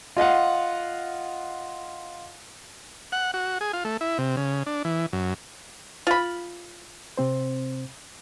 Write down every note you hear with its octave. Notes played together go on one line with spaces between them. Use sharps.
F4 D#5 F5 F#5
F#5
F#4
G#4
F4
A3
E4
C3
C#3
D4
E3
F#2
F4 B5
C3 C4 C5